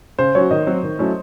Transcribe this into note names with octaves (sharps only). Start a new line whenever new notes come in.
C#3 C5
F#3 C#4 F#4 C#5
D#3 D#5
F#3 C4 F#4
D#3
F#3 A3 C#4 E4